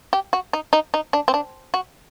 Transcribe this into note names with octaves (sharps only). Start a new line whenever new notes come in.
G4
F#4
D#4
D#4
D#4
D4
C4
D4
F#4